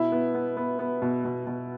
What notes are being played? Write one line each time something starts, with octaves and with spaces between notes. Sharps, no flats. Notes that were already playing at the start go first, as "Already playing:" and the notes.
Already playing: B2 E4
B3
B3
B3
B3
B2
B2
B2